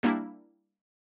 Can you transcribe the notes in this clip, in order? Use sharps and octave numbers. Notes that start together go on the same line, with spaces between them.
G3 A#3 D4 E4